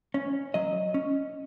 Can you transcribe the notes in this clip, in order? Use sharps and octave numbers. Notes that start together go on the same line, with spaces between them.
C#4
F#3 D#5
C#4